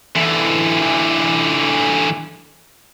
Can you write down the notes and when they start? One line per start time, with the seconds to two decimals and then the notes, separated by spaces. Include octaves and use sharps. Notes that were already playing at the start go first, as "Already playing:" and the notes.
0.16 D3 E3